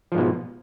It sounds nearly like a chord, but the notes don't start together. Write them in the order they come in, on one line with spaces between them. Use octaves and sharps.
F3 G#2 B2